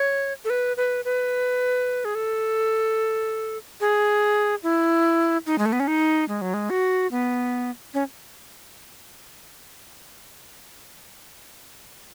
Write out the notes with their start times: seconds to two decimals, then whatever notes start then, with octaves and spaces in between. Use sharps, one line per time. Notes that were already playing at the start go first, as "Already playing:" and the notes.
Already playing: C#5
0.45 A4
0.50 B4
0.77 B4
1.05 B4
2.05 G#4
2.15 A4
3.80 G#4
4.63 E4
5.46 D#4
5.58 G#3
5.66 A3
5.73 B3
5.80 C#4
5.88 D#4
6.29 G#3
6.41 F#3
6.54 G#3
6.70 F#4
7.11 B3
7.94 C#4